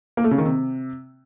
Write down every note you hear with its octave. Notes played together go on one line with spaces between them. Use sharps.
A#3
A3
C#3
D#3
C3